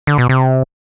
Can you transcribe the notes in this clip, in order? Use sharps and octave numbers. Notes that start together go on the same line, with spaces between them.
D3
B2
C3